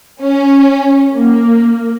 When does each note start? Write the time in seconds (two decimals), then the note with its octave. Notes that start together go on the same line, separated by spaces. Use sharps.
0.21 C#4
1.14 A#3